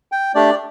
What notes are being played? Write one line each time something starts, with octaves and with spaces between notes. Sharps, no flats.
G5
A3 D4 G4 D5